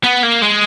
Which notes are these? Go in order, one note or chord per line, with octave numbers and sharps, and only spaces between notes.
B3
A#3
G#3